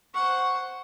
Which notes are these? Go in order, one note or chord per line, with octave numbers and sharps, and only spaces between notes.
C5 F#5 C#6